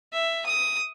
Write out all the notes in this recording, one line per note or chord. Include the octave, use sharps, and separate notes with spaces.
E5
D#6